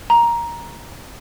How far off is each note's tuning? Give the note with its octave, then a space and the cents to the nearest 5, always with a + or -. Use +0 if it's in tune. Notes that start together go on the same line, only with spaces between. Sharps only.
A#5 +10